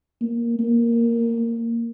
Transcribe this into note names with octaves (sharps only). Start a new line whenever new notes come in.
A#3
A#3